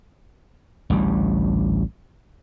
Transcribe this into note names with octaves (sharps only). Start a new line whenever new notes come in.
A1 D2 G3